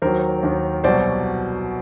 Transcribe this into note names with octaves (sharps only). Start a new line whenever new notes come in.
D#2 D#3 F#3 A#4 C5
D#2 D#3 F#3
C2 B2 F#3 C5 D5